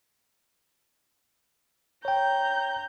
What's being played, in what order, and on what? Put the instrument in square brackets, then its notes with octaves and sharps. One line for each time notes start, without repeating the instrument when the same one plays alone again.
[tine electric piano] C#5 G5 [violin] A#5 G6